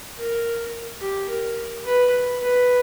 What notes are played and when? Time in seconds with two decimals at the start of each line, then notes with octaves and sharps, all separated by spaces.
0.18 A#4
1.01 G4
1.30 A#4
1.86 B4
2.43 B4